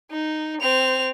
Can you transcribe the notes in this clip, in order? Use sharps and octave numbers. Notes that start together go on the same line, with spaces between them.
D#4
C4 F7